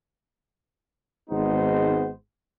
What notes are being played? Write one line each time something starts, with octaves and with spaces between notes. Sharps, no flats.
G#1 G#3 B3 D#4 C5